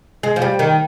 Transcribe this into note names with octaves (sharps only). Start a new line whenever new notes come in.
G#3
F3
G3
D#3